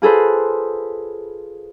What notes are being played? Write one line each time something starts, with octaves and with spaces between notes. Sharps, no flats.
F4 G#4 A4 B4 C5